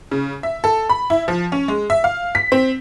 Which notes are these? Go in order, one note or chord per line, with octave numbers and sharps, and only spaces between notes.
C#3
E5
A4
B5
E4
F3
C#4
G#3
E5
F5
B6
C4